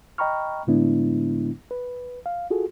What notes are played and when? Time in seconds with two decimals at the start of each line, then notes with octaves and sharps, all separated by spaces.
0.18 D#5 G5 A#5 B5 C#6 F6
0.67 A2 D3 G#3 B3 D4 E4
1.71 B4
2.26 F5
2.50 F4 F#4 G#4 A4